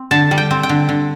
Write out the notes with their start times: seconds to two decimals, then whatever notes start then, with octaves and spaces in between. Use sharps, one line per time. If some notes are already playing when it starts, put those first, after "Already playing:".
Already playing: C4
0.11 D3 A5
0.31 G3
0.38 G5
0.51 C4
0.63 G5
0.69 D3
0.89 D3